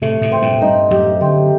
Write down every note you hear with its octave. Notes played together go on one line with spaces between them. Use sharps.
A2 C3 A3
A2 C3
C4
G2 A#2
A2
G2 D#4
F#2 A2 G4
D3 F#3 C4